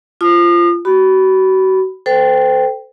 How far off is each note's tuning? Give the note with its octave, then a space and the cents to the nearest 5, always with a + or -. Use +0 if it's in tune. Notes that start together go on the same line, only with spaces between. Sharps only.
F4 -20 A5 -10 D#6 -40
F#4 +35 B5 +0
A4 +0 C5 -35 G5 +0